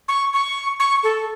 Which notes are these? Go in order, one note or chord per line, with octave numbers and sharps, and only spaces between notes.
C#6
C#6
C#6
A4